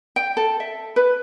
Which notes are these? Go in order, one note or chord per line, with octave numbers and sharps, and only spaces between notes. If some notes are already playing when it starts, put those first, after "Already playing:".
G5
A4
E5
B4